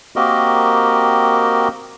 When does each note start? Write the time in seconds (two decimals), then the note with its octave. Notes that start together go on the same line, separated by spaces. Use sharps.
0.16 A#3 C4 F#4 G4 A#4 D#5